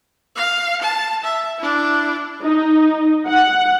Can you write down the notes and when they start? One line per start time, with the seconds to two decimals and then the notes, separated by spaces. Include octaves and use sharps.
0.36 F5
0.81 A5
1.24 E5
1.58 D4 E4
2.43 D#4
3.28 F#5